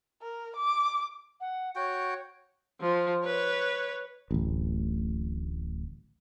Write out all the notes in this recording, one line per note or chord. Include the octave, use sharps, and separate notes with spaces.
A#4
D6
F#5
F#4 C#5 G5
F3
B4 C#5
D1 A1